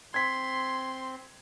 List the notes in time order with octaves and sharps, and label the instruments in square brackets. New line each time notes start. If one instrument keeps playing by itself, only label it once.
[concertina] C4 [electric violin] C6 [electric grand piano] G#6 B6